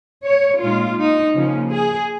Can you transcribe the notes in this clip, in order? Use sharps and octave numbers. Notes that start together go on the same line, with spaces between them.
C#5
A#2 G#3 D#4 F4
D#4
C#3 F3 A#3 C#4
G#4